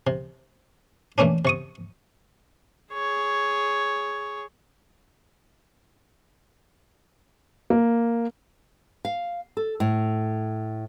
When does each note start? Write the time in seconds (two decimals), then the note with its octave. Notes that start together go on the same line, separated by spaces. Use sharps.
0.07 C3
1.18 E3 A3 A#3 C#4 D4
1.45 C3 C#6 D#6
2.93 G#4 C#5
7.70 A#3
9.05 F5
9.57 A4
9.80 A2